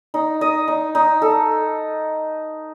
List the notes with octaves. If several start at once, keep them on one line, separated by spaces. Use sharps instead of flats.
D#4
D#5
D#4
D#4
A4